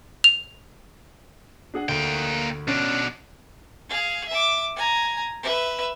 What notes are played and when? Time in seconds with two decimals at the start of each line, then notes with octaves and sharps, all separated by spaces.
0.24 F7
1.74 D4 G#4 F#5
1.89 D2 A#3 G5
2.68 B2 C#4 D4
3.89 G#4 F5
4.29 E5 D6
4.76 G#5 A#5
5.43 B4 E5